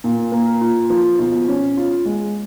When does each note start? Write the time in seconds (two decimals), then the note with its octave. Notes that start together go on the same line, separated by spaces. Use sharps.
0.04 A#2
0.32 A#3
0.61 F4
0.90 F3
1.19 B2
1.48 C#4
1.77 F4
2.06 G#3